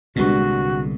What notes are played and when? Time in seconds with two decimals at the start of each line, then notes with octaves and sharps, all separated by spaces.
0.16 C2 A#2 D3 G3 G#3 B3 D4 F#4